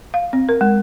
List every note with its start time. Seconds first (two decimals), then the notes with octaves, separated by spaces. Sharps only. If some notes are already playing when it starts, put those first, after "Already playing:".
0.14 F5
0.33 C4
0.49 A#4
0.61 G#3